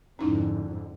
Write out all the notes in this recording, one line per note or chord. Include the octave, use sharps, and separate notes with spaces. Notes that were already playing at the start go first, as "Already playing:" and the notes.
F2 G#2 D3 C#4 D#4 E4